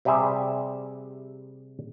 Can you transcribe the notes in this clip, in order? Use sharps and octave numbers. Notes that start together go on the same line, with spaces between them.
C3 G3 G4 G#4 E5